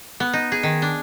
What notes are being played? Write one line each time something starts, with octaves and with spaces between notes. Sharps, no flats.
B3
D#4
G#4
D#3
D4